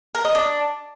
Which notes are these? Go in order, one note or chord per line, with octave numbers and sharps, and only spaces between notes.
A#4
D#5
D4